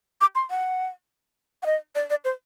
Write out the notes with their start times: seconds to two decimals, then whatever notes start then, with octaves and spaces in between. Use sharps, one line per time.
0.21 D6
0.35 C6
0.50 F#5
1.63 F#5
1.66 D#5
1.95 D5
2.10 D5
2.25 C5